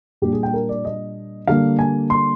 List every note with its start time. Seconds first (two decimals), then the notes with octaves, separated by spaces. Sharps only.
0.22 A#2 G3 D4 G4
0.33 G#4
0.43 G5
0.53 A#4
0.69 D5
0.85 D#5
1.47 D3 G3 A#3 D4 F5
1.79 G#5
2.10 C6